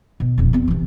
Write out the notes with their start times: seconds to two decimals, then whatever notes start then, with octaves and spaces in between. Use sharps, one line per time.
0.20 B2
0.38 D#1 F2
0.53 E2 C4
0.68 C3 E3